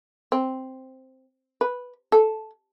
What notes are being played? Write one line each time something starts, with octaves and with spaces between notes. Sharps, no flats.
C4
B4
A4